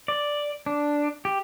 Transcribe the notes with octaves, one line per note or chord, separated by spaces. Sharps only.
D5
D4
G4